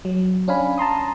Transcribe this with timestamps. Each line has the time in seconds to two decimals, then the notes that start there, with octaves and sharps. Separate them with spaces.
0.05 F#3
0.48 C#4 D4 F5 G#5 B5
0.78 A5 A#5 C6 D#6